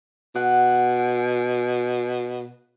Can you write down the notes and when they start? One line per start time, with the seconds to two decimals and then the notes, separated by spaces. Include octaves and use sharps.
0.36 B2 F#5